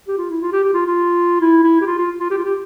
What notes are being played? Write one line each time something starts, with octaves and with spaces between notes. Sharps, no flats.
G4
F4
E4
F4
G4
G4
F4
F4
E4
E4
G4
F4
F4
F4
G4
F4
G4